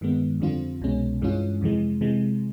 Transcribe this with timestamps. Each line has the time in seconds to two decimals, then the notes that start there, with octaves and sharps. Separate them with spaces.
0.01 G2 D#3 G#3 B3
0.40 F2 D3 G3 C4 F4
0.81 C2 B2 G#3 C#4
1.22 G2 E3 G#3 C#4 F4
1.61 F2 C3 E3 G#3
2.01 C3 E3 G#3